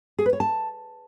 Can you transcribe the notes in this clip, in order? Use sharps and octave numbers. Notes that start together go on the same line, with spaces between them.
G#4
B4
C#5
A5